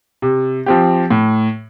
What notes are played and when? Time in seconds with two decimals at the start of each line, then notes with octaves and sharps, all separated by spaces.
0.22 C3
0.66 F3 C4 G4
1.10 A2